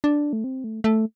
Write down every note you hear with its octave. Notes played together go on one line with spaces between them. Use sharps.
D4
A3
C4
A3
A3